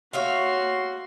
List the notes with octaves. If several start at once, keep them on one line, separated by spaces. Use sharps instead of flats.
F#4 C#5 E5 F5 C6